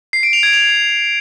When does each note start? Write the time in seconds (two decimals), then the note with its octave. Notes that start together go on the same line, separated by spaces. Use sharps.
0.13 C7
0.23 D7
0.33 F7
0.43 G#6
0.53 F7